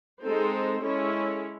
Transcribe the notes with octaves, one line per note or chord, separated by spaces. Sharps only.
G#3 C4 D#4 A4 C5
G#3 C#4 E4 A4 C#5